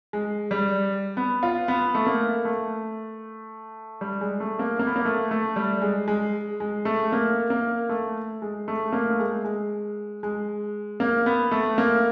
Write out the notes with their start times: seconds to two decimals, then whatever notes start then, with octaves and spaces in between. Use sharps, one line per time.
0.13 G#3
0.51 G3
1.17 B3
1.43 F4
1.68 B3
1.95 A3
2.06 A#3
2.45 A3
4.01 G3
4.21 G#3
4.40 A3
4.59 A#3
4.79 A#3
4.87 B3
4.96 A#3
5.05 A3
5.31 A3
5.56 G3
5.82 G#3
6.08 G#3
6.60 G#3
6.85 A3
7.12 A#3
7.50 A#3
7.89 A3
8.42 G#3
8.68 A3
8.93 A#3
9.10 A3
9.19 G#3
9.44 G#3
10.23 G#3
11.00 A#3
11.26 B3
11.51 A3
11.78 A#3